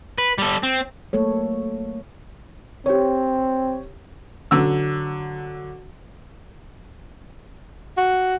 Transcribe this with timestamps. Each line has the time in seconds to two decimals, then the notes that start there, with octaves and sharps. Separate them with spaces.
0.18 B4
0.38 G3 A4
0.63 C4
1.13 F#3 A3 A#3 A4 C#5
2.86 C4 G4 C#5
4.51 D3 F#3 E6
7.97 F#4